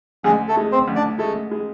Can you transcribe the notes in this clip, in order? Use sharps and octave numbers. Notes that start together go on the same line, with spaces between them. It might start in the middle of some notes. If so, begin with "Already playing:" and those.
D2 G#3 G#4
A3 A4
G#3
C4 C5
D2
D4 D5
G#3 A3 A4
G#3